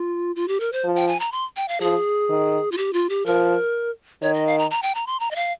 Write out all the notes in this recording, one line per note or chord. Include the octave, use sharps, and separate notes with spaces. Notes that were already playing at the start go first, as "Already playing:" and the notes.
Already playing: F4
F4
G4
A#4
C5
F3
G5
G#5
A#5
C6
G5
F5
F3 G#4
D#3
F4
G4
F4
G4
F3 A#4
D#3 C#5
D#5
F5
A#5
A#5
G5
A#5
C6
A#5
D#5
F5